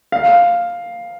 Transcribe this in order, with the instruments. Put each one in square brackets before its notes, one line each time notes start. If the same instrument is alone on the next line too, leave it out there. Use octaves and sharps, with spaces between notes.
[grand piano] F5